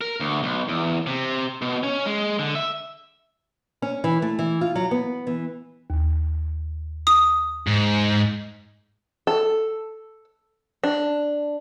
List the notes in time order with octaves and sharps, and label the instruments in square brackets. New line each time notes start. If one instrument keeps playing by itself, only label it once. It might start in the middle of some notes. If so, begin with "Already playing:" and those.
[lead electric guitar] A#4
D2
B1
E2
C3
B2
C#4
G#3
D3
E5
[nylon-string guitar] C#4
E3
A3
E3
F4
F#3
B3
E3
[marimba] D#2
[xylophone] D#6
[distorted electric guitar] G#2
[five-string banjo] A4
D4